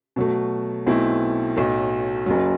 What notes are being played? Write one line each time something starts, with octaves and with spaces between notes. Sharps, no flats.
B2 F#3 A3
B1 B2 A3 C4 E4
B1 A2 F#3 A3
F#1 F#2 F#3